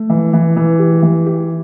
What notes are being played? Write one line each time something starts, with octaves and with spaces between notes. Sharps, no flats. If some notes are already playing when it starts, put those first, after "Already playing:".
Already playing: A3
E3
E3
E3
G4
E3
G4